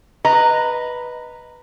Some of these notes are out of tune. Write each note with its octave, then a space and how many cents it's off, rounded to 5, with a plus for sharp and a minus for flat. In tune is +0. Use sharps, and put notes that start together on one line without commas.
B4 -5 D#5 +0 A#5 -20